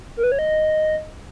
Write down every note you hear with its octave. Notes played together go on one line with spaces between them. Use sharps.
A#4
B4
C#5
D#5